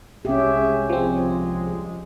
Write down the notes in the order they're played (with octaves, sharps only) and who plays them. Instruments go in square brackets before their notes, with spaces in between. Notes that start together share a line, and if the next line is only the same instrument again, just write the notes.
[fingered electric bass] C2 [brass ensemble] G#3 G#4 E5 [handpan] C#4 G4
[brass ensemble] G1 G#3 G#4 [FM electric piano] F3 C4